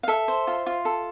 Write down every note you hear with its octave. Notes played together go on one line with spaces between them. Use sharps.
F5
A4 E5
C5
F4
F4
A4